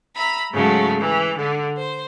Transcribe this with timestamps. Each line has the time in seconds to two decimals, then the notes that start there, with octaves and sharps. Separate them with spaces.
0.15 E5 A#5 B5
0.52 G#2 C#3 F#3 A3
0.99 E3
1.36 D3
1.76 C5